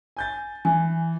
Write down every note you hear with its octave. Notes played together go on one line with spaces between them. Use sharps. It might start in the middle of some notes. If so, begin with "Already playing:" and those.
G#5 G6 A6
E3 G#5